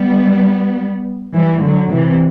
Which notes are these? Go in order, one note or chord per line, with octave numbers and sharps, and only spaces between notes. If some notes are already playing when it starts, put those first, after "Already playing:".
Already playing: G3 B3
E3 G3
D3 F#3
C3 E3